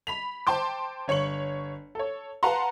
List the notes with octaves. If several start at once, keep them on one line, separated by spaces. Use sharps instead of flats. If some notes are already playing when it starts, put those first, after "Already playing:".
B5 B6 F7
C5 G5 A5 C6 D6
G1 C#5 C#6 C#7 F#7
A4 C#5
B4 F5 F#5 A5 A#5 C6